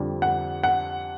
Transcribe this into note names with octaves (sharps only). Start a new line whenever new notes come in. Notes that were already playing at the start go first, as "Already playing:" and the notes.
Already playing: F2 D3 G3
F#5
F#5